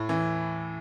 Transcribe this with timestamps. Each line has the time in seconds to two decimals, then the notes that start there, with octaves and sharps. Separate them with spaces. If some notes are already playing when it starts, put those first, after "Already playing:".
Already playing: A2
0.09 E3